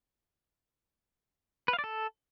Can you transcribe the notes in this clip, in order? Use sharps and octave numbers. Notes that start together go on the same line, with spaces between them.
B4
F5
D5
A4